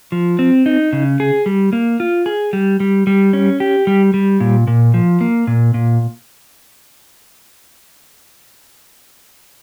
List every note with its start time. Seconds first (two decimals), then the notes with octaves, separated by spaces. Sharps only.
0.12 F3
0.39 C4
0.66 D#4
0.93 C#3
1.20 G#4
1.46 G3
1.73 A#3
2.00 F4
2.26 G#4
2.53 G3
2.80 G3
3.07 G3
3.33 C#4
3.60 G4
3.87 G3
4.14 G3
4.40 A#2
4.68 A#2
4.94 F3
5.21 A#3
5.47 A#2
5.74 A#2